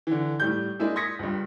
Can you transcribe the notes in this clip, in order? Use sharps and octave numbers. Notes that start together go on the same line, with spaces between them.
D3 E3
A2 G3 G6
G#3 A#3 D4 E4 G#4
C6 D#6 G#6 A#6 B6 C#7
C#2 G2